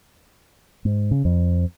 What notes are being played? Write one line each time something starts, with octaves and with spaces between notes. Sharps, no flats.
G#2
C#3
F2